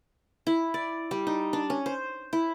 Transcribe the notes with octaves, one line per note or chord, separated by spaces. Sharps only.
E4
D5
G3
D#4
D4
C#4
C5
E4